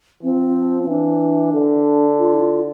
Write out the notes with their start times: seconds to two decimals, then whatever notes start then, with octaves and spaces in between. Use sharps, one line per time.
0.23 F3 C4
0.83 C4
0.88 E3 D4
1.54 D3
2.19 F4
2.34 E4
2.40 F4